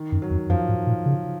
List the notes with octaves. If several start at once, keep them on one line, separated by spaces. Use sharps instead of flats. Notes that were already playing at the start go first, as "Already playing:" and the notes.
Already playing: D#3
F#2
F#3
F2
F#2 F3
G#2
A#2
C#3